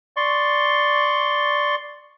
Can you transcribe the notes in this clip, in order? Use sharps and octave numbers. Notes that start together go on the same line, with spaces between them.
D5 C6 C#6